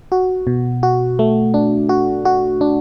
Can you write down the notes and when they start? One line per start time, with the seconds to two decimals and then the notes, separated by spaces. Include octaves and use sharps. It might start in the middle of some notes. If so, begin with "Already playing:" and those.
0.12 F#4
0.47 B2
0.83 F#4
1.19 A3
1.54 D4
1.89 F#4
2.25 F#4
2.61 D4